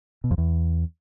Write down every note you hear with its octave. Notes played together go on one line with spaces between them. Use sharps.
B2
F2
E2